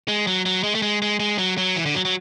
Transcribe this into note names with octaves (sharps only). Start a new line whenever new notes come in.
G#3
F#3
F#3
G#3
A3
G#3
G#3
G#3
F#3
F#3
E3
D3
F#3
F#3